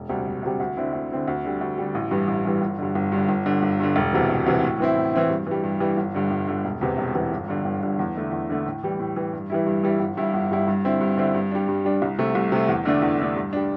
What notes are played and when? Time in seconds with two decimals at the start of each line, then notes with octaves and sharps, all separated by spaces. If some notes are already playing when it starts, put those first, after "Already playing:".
Already playing: E1
0.09 D2 C3 G3
0.27 E1
0.43 D2 C3 G3
0.60 D2
0.77 D3 C4 E4
0.93 D2
1.11 D3 C4 E4
1.28 D2
1.45 D3 G3
1.61 D2
1.78 D3 G3
1.95 A1
2.11 G2 E3 G3
2.28 A1
2.45 G2 E3 G3
2.62 G1
2.79 G2 D3
2.95 G1
3.12 G2 D3
3.29 G1
3.46 G2 D3
3.63 G1
3.80 G2 D3
3.96 E1
4.13 D2 C3 E3
4.29 E1
4.47 D2 C3 E3
4.64 A2
4.80 E3 C4 E4
4.96 A2
5.14 E3 C4 E4
5.30 G2
5.47 E3 G3
5.64 G2
5.80 E3 G3
5.97 G1
6.14 G2 D3
6.31 G1
6.48 G2 D3
6.65 E1
6.81 E2 C3 E3
6.98 E1
7.15 E2 C3 E3
7.32 G1
7.48 G2 D3
7.65 G1
7.83 G2 D3
7.99 E2
8.16 D3 A3 E4
8.32 E2
8.50 D3 A3 E4
8.66 A2
8.83 E3 G3
9.00 A2
9.16 E3 G3
9.33 G2
9.50 E3 G3 E4
9.66 G2
9.83 E3 G3 E4
10.00 G1
10.17 G2 G3 E4
10.34 G1
10.50 G2 G3 E4
10.68 G2
10.84 D3 C4 E4
11.01 G2
11.17 D3 C4 E4
11.35 G2
11.51 G3 D4
11.68 G2
11.85 G3 D4
12.02 C2
12.18 C3 A3
12.35 C2
12.52 C3 A3
12.68 E2
12.85 D3 A3 D4
13.02 E2
13.20 D3 A3 D4
13.36 G2
13.53 G3 D4